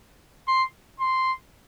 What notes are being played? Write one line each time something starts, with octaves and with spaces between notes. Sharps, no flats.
C6
C6